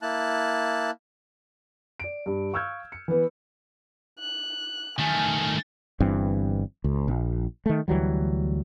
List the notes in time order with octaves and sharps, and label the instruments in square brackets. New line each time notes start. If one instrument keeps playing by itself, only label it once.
[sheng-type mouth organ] A#3 E4 A5 F#6
[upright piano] D5 D7
G2
F5 C#6 E6 F6 G6 G#6
C#7
E3 B3
[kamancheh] F#6
[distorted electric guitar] D#3 A3 [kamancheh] G#5 F6
[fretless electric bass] G1 G2 E3 C4
C#2
A#1
D#3 A3
D2 E3 F#3 G3